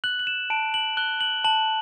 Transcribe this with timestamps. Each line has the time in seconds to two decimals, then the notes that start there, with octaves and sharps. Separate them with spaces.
0.04 F#6 F#7
0.19 F#7
0.27 E7
0.50 A5 D7
0.74 F#7
0.97 F#6 G7
1.21 F#7
1.44 A5 F#7